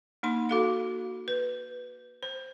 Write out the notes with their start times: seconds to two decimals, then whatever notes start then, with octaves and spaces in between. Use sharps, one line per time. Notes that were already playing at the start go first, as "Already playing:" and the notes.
0.23 A#3 D#4 C6
0.49 F#4 A4 F5
1.28 B4
2.23 C5